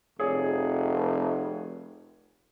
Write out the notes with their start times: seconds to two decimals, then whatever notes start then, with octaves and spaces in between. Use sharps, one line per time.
0.19 F1 G#4 C#5 D5